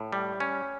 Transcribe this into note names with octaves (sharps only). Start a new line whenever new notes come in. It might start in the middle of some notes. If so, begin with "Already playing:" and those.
Already playing: A2
G3
C#4